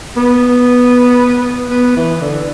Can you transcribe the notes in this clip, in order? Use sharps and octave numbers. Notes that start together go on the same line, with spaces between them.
B3
B3
E3
D3